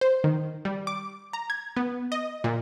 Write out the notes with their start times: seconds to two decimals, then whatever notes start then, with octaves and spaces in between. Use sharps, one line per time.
0.01 C5
0.24 D#3
0.65 G3
0.87 D6
1.33 A#5
1.50 G#6
1.77 B3
2.12 D#5
2.44 A#2